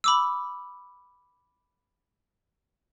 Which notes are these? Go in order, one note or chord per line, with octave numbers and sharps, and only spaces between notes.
B5 D6 E6